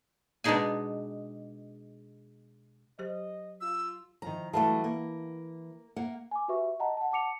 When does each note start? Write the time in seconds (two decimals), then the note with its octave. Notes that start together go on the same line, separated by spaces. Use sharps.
0.44 B2 G#3 D4 D#4 G#4 G#5
2.99 F#3 G4 C5 D#5
3.61 F4 E6
4.22 D#3 F3 A#5
4.53 E3 F#3 G3 A3 F5 A5
4.84 A#3
5.96 A#3 F#5
6.31 G#5 D6
6.48 F#4 G4 B4 E5 C#6
6.80 D#5 F#5 A5 A#5
6.97 F#5 A5
7.11 F#5 A5 D6 C#7 F7